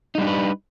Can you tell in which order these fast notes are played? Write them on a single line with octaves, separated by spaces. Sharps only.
D#4 G3 D4 G4 B4